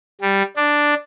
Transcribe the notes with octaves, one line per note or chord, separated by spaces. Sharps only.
G3
D4